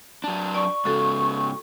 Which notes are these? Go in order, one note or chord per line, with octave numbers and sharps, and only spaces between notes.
F#3 D4
D5 C#6
G#2 C#3 F#4 A4